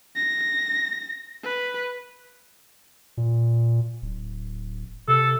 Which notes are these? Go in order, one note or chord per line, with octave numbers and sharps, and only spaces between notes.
A#6
B4
A#2
D1
C3 A4